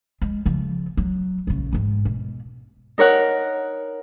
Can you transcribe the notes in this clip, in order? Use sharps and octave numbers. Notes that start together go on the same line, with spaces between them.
G#3
C#3 F3
F#3
A#1 C#3
E2 G#2
B2
D#4 A#4 C#5 F#5